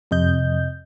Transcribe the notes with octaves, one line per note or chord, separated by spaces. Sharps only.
F2 C3 D#5 G6